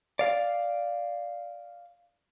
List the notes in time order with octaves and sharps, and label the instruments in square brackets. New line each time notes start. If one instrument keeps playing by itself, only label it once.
[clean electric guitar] D5 F5